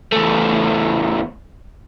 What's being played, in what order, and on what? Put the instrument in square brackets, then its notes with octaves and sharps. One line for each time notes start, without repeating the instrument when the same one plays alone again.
[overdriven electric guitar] E2 A3